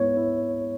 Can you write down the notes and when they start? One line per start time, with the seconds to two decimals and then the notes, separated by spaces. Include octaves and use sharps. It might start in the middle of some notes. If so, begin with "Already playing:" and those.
Already playing: G#2 B3 E4 C#5
0.17 E4